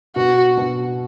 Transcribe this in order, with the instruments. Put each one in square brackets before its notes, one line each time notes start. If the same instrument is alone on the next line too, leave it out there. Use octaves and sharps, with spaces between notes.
[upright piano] B2 [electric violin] F#4
[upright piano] B2